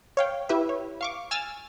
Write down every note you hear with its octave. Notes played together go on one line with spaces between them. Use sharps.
C#5 F5 G5
E4 G4 B4 E5
C#5
F5 C#6 D6
G#5 E6 F6 A6